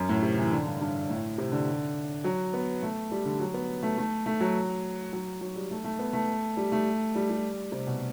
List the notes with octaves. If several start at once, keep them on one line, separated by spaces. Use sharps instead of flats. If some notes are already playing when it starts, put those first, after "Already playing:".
Already playing: F#2
A2
C3
E3
D3
G2
G2
A2
C3
D3
F#3
B3
A3
G3
D3
F#3
B3
A3
A3
A3
F#3
F#3
F#3
G3
A3
A3
B3
A3
G3
A3
G3
G3
C3
B2